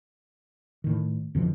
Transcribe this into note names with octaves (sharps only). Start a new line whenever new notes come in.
A2 D#3
F2 D3 E3 F3